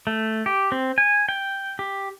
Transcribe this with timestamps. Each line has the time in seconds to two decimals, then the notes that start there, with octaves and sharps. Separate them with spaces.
0.07 A3
0.46 G4
0.72 C4
0.98 G#5
1.29 G5
1.79 G4